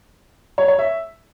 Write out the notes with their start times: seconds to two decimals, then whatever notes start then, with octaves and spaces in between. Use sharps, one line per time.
0.58 C#5
0.68 C#5
0.79 E5